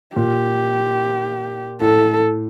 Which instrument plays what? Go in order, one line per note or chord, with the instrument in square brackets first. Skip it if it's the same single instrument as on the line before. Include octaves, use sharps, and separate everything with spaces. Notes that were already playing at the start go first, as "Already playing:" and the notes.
[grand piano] A#2 [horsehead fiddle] G4
[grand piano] A2 [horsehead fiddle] A4